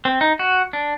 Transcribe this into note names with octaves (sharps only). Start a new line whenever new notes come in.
C4
D#4
F#4
D4